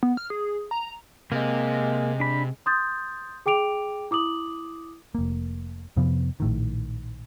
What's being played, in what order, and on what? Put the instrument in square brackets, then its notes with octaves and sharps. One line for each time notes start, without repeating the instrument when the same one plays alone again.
[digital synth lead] B3
F6
G#4
A#5
[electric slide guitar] C3 [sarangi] G#3 [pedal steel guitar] A#3
[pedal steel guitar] D4 B5
[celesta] C6 D#6 G6 A6
G#4 G5 D6 D7 F7
E4 D6 D#6 F#7
[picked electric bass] F1 A#3
F2 C3 F3 B3
A#1 A2 D#3